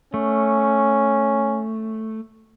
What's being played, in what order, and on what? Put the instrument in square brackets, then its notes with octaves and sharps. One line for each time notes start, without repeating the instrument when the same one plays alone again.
[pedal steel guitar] A3 [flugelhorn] C#4